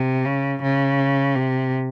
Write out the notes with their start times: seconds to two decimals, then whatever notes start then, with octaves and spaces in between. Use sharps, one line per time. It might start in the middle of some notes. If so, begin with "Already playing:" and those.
Already playing: C3
0.25 C#3
0.62 C#3
1.35 C3